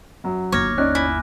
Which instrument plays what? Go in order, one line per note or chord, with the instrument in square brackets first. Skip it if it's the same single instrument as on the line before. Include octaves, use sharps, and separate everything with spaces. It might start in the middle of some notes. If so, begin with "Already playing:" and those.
[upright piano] F#2 F#3
[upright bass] G1 D#2 [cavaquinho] C#5 [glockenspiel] D6 F6 A#6
[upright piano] C#4 D#4 D5 [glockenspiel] F#6
[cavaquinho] E4 [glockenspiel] G#5